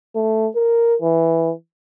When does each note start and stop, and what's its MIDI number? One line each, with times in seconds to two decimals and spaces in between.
0.15 0.47 57
0.55 0.95 70
1.02 1.52 52